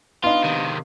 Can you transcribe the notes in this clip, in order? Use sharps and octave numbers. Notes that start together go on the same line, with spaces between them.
B3 D4 D#4 F4 F5
C3 D#3